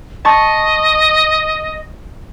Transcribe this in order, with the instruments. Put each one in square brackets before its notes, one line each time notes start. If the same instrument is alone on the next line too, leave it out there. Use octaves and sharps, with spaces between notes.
[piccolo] D#5 [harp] A5 C#6 A6